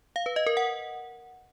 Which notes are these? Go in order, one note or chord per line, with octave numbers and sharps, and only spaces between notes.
F5
B4
D#5
A#4
F#5